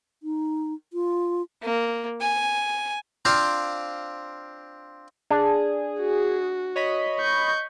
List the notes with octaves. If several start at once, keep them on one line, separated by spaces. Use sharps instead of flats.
D#4
F4
A#3
G#5
C4 D4 F4 C5 F5
D4 G#4
F#4
C#5 D#5 B5
C#6 G6